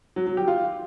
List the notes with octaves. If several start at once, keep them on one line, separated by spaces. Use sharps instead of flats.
F#3
F#3
G4
F4